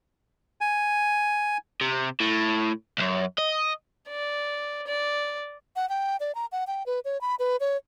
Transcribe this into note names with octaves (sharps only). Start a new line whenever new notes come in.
G#5
C3
A2
C2 F#2
D#5
D5
D5
F#5
G5
D5
A#5
F#5
G5
B4
C#5
B5
B4
C#5